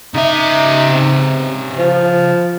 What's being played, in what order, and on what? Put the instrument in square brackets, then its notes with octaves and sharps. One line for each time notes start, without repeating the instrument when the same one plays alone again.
[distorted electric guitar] C#3 E5 [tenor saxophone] D#4
[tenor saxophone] C3
F3